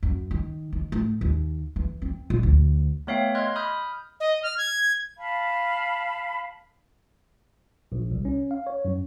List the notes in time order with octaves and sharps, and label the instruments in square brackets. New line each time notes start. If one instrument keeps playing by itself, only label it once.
[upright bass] F#2
D#3
D#3
A2
D#2
E3
C4
A#2
D2
[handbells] A3 B3 C#5 E5 F5 G5
D#5 C6 F6 F#6 G#6
B5 D#6 F6 G6
[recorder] D#5
F6
G#6
[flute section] F5 A5 B5
[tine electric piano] A#1
C2
C#4
F5
C#5
F#2